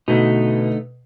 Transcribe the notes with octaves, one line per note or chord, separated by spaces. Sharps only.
B2 D3 A3 D#4